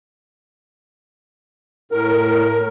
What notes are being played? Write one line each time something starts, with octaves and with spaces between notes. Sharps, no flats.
A2 A#4